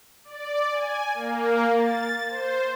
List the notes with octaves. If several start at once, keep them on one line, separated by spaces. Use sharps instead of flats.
D5
G#5
A#3
A6
C5